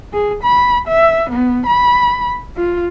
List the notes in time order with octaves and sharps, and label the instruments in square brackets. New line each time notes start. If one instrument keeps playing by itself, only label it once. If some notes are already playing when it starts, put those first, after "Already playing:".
[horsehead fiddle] G#4
B5
E5
B3
B5
F4